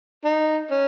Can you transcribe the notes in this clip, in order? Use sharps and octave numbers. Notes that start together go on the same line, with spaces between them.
D#4
C#4